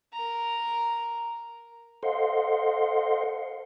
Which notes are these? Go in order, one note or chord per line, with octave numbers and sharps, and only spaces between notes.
A#4 A#5
A4 C5 D#5 F5 F#5 C6